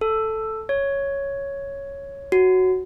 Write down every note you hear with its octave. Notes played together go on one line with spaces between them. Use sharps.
A4
C#5
F#4